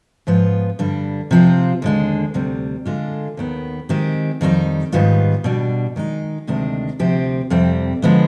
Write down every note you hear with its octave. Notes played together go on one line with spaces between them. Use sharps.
G#2 F3 B3 F4
G2 D3 G3 D4
C3 F3 C4 F4
D#2 D3 G#3 D4
D2 C3 G3
D3 G#3 D4 F4
D#2 D#3 B3
D#3 G#3 C4 G4
F2 D#3 G3 C4 D#4
G#2 D#3 G3 B3 F4
B2 G3 D4
D#3 G#3 B3 D#4
D2 C3 D#3 G#3 D4
D2 C3 F3 C4 G4
F2 C3 G3 C4
D3 F3 G#3 B3